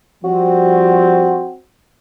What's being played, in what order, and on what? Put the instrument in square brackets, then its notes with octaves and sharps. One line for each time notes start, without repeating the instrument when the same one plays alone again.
[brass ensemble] F3 G3 C4 [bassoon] F#4